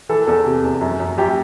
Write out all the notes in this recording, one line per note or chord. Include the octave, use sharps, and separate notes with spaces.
E3 A4
E2 A4
C3
E2
F#2
F#2
F#2 G4